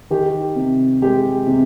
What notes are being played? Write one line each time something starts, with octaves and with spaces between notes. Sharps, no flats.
D#3 G4
C3
G#3 G4
C3